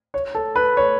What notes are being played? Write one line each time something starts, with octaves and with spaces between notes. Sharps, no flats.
C#5
A4
B4
C#5